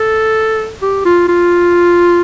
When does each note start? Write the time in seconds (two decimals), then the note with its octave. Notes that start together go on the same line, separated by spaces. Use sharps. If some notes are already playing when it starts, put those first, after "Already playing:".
Already playing: A4
0.82 G4
1.05 F4
1.28 F4